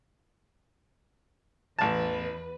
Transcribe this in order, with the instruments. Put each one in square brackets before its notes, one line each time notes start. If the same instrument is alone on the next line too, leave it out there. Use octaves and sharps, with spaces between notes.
[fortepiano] A1 A5 [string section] E2 B4